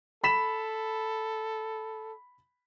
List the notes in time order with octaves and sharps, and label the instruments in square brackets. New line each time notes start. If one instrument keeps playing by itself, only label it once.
[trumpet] A4 [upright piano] B5 B6 E7